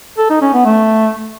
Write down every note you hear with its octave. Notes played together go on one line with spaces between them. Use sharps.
A4
D#4
C#4
B3
A3